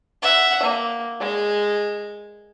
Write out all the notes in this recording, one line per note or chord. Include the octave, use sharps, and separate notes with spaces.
E5 F#5
A#3
G#3